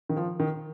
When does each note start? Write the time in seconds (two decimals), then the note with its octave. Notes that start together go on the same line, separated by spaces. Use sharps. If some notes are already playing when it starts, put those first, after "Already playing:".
0.09 D#3
0.16 F3
0.40 D#3